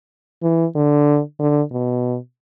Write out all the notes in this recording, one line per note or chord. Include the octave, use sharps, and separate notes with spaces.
E3
D3
D3
B2